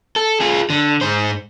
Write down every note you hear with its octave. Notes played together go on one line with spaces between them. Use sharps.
A4
F4 G#4
D3
G#2 C5